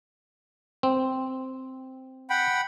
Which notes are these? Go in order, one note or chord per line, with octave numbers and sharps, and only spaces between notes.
C4
F#5 G5 B5